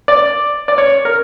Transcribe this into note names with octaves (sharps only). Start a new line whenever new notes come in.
D5
D5
C#5
A#4